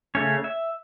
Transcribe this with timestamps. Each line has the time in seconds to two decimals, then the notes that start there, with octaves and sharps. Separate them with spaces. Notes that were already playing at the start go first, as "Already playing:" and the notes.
0.15 C#3 A3 C#4 C#5
0.44 E5